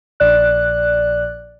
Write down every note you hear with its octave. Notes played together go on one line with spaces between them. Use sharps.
A#1 D5 F#6